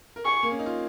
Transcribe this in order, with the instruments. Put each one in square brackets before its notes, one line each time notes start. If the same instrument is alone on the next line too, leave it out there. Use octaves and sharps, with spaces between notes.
[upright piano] A#4
[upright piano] G#4 [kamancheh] C#6
[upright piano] A#3
C#4
D#4
F4